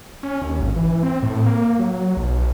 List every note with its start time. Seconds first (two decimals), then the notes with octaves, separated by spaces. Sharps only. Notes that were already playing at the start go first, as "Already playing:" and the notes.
0.23 C#4
0.42 D#2
0.60 G#1
0.76 E3
1.03 C4
1.23 A2
1.46 A#3
1.79 F#3
2.17 B1